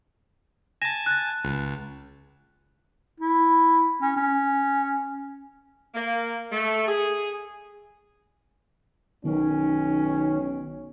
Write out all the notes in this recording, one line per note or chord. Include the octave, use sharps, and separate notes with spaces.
G#5 A5 A#6 E7
F#6 A6
C#2
E4
C#4
C#4
A#3
A3
G#4
B1 D#3 C#4